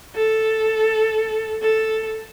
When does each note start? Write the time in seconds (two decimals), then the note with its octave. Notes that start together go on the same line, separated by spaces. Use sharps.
0.16 A4
1.62 A4